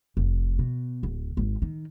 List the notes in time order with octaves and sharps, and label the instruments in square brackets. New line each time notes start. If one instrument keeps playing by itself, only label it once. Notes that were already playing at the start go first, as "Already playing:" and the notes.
[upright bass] F1
B2
D1
G#1
D#3